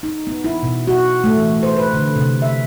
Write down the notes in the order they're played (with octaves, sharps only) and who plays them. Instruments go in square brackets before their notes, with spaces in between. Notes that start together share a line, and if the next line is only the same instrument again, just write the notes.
[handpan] D#4
B3
E4
B2
F#4
A3
E3
C5
B4
D3
C3
E5